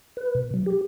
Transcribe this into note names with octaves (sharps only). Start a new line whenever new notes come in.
B4
B2
F#3
G4